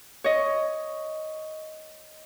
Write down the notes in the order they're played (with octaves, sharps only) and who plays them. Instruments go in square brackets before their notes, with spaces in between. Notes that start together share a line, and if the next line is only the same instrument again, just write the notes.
[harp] C#5 D#5